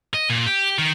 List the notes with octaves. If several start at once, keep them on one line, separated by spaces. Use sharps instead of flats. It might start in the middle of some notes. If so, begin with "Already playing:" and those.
D#5
A#2
G4
D#3